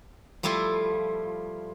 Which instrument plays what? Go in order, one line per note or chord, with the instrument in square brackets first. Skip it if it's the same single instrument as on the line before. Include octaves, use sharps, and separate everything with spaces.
[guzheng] F3 G3 A3 E4 F4